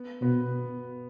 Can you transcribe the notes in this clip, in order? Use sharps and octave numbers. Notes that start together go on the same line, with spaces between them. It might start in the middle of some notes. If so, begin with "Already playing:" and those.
Already playing: B3
B2 B3